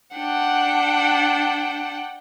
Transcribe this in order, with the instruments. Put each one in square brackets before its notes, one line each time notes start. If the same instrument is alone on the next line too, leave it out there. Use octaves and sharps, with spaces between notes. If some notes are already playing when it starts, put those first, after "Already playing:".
[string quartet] D4 F#5 G5